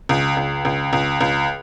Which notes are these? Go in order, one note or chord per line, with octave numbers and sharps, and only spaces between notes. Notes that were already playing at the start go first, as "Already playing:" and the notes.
C#2
C#2
C#2
C#2
C#2